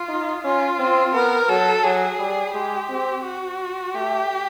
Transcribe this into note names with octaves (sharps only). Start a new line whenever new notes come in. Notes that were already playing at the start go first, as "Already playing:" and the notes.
Already playing: F4
D#4
C#4 F4
C4
B3 A#4
F#3 A4
F#3 G#4
G3
G#3 G4
C4
F#4
A3 G4